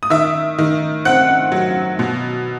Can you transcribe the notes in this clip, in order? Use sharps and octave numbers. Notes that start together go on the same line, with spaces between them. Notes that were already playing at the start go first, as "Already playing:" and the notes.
D#6
D#3 E5 E6
D#3
C4 F#5 F#6
F#3
B2